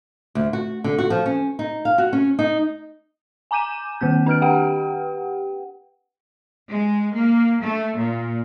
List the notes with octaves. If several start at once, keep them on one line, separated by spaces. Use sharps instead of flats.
D2
F#4
D3
F#4
F3
C#4
D#4
F5
F#4
C#4
D#4
G#5 A#5 D6 G6 D#7 E7
D#3 A#3 C4 G6
D4 B4 F6 D7
G4 B4 F#5 G5
G#3
A#3
A3
A#2